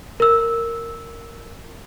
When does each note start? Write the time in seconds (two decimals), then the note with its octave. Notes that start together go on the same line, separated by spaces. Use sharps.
0.20 A#4 E6